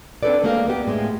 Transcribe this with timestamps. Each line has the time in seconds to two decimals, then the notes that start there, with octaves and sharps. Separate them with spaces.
0.23 C4 D4 D#4 A4 B4 D5
0.43 G#3 A#3 G4 A#4 F5
0.67 A#3 B3 G4
0.87 A2 G#3 A#3